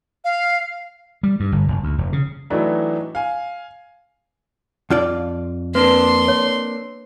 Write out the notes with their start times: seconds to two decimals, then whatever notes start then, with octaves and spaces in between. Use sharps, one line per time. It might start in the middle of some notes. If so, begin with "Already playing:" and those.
0.24 F5
1.23 G3
1.40 G2
1.52 G1
1.68 F#1
1.83 D2
1.98 F1
2.13 C#3
2.50 A2 E3 F#3 A3 D4 D#4
3.15 F5 G#5
4.90 F2 F4 D5
5.75 A#3 C4 D4 B4 C6
6.28 C#5